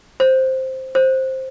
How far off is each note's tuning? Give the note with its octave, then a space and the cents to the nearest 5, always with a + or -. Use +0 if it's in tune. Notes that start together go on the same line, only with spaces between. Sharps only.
C5 +5
C5 +10